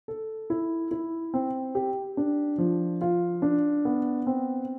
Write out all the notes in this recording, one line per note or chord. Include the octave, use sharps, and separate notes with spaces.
A4
E4
E4
C4
G4
D4
F3
F4
D4
B3
C4